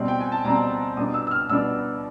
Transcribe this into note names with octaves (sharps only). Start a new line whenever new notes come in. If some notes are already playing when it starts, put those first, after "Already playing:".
Already playing: B2 G3 C4
G5
G#5
A5
B2 G3 C4 A#5
B2 G3 B3 D4 D#6
E6
E6
F6
B2 G3 B3 D4 E6